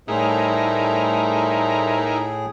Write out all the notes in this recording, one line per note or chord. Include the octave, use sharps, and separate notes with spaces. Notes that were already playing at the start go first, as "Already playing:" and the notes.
A2 G3 A3 D#4 E4 G#4 A#4 C5